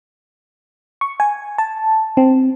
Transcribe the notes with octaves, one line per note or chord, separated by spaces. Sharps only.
C#6
G#5
A5
C4